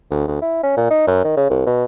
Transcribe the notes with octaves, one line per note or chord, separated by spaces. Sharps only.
D2
D2
E4
C#4
A#2
D#4
F#2
D#3
C#3
C2
B2